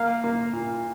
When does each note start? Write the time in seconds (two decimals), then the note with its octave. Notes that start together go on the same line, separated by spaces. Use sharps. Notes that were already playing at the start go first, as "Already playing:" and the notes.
Already playing: A#3 F5
0.24 A#3
0.53 A#2